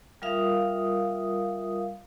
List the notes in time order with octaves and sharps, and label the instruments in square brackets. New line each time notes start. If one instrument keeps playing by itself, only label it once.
[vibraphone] G3 F4 A#4 E5 F5 D#6